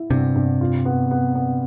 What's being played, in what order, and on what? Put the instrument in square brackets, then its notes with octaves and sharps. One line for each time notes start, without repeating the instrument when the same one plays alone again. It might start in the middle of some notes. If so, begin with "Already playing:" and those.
Already playing: [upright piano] E4
[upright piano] G2 [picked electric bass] C3
[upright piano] G2
F4
B3
B3
B3